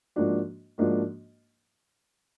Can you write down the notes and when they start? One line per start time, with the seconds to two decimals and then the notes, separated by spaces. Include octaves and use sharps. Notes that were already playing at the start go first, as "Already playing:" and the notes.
0.16 G#2 F3 A#3 D4 F#4
0.78 G#2 F3 A#3 D4 F#4